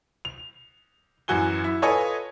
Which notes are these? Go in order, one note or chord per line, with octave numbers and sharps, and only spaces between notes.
F7
F#2 E3 F#4 G#5 G7
E4
F4 A4 B4 C#5 D#5 G#5